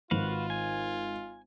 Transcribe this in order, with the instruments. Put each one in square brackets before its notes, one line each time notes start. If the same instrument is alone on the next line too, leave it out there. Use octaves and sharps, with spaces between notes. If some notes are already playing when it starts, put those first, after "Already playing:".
[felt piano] G#1 [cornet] F4 [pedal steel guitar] F#4 B4 F5
[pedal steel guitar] G#5